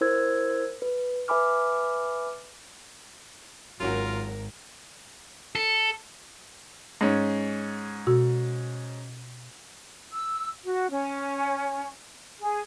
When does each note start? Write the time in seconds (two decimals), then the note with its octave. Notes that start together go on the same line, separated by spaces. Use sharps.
0.01 E4 A#4 C5 E6 G#6
0.82 B4
1.28 B4 E5 G#5 B5 D6 F6
3.80 G#1 F#3 C#4 F4 F#4 A#4
5.55 A4
7.01 G#2 C#4
8.07 B2 F#4
10.13 E6
10.65 F#4
10.90 C#4
12.40 G#4